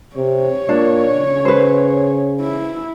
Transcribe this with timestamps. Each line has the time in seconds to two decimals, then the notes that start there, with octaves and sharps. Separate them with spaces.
0.16 C3 C#5
0.69 A#2 D4
1.13 C#3
1.45 B4 C5
2.41 E4